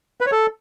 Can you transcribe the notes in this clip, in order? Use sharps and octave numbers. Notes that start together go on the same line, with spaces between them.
B4
C#5
A4